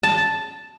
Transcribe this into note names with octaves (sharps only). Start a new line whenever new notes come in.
A5